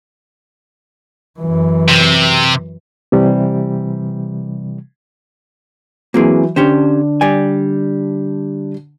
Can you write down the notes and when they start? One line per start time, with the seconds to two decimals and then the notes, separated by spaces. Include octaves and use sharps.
1.40 F#2 E3
1.89 C3
3.12 C3 E3 G3
6.14 E3 F#3 A#3 C4 G#4
6.56 D3 C#4 D4 G4 C5
7.21 G3 D5 G#5